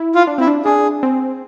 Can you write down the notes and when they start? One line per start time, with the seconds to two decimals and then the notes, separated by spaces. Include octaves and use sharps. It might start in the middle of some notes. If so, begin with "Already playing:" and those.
Already playing: E4
0.15 F4
0.27 D4
0.38 C4 E4
0.47 D4
0.65 D4 G#4
1.03 C4